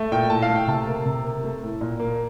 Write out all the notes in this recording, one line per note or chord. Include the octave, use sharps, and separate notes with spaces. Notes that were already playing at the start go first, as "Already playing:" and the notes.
Already playing: A3
A#2 G5
A2 A5
F5
A3
G5
C3 A5
A#3
C3
A#3
A3
A2
A#2
A#3